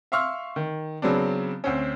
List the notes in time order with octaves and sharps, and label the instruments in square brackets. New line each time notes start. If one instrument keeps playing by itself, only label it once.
[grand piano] E5 F5 C6 C#6 E6 F6
D#3
C#3 F#3 B3 C4 D4
D2 C4 C#4